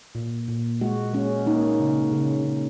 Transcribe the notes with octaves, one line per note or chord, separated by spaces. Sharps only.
A#2
A#2
G#3 F#4
G#3 C#4
A#3 D#4
C#3
C#3
C#3